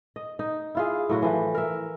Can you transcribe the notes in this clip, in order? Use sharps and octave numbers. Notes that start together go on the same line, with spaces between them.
D#5
D#4
E4 F4 G#4
A2 F#3 F#4
E3 F3
A#4 E5